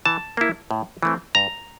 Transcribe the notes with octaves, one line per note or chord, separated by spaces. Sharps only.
E3 A5
A#3 E4
A2
E3 A3 C4
G2 A#5